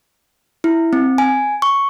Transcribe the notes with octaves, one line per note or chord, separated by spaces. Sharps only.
E4
C4
G#5
C#6